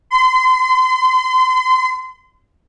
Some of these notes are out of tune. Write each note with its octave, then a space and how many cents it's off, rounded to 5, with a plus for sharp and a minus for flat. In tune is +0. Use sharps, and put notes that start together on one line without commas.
C6 -35